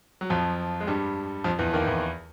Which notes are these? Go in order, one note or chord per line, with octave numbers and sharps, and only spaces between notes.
F#3
F2 F3
G#3
G2 G3
F2 F3
E2 E3
D#2 D#3
E2 E3